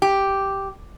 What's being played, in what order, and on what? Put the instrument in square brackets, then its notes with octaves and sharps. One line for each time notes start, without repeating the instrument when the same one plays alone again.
[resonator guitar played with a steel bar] G4